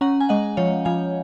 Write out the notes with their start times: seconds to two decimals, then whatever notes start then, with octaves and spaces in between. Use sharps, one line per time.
0.01 C#4 F#5 A#5
0.21 G#5
0.29 G#3 D#5 F#5
0.57 F3 C#5 F5
0.85 F3 F5 G#5